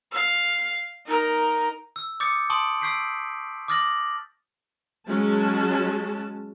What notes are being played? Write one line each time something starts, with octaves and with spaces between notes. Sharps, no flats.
F5
D#4 A#4
E6
D6 D#6 G6 A6 C#7
A5 C6 C#6 D#6 D7 F#7
C#6 E6 G6 B6 C7 D7
D6 D#6 F6 A6 A#6 F#7
F#3 G#3 C#4 F#4 A5